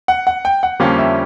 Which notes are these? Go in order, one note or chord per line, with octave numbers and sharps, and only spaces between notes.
F#5
F#5
G5
F#5
F2 D3 G3 A#3 C#4 F5
E5